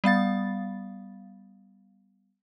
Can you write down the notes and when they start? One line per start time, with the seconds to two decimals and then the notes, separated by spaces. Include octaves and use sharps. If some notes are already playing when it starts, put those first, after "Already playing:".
0.04 G3 B3 F5 A6